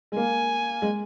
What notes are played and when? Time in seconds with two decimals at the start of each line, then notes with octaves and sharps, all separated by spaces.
0.12 G#3
0.17 A#3 G#5
0.82 G#3